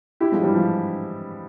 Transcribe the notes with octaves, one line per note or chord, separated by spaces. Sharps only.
E4 G4
F3 G#3
E3 G3
F3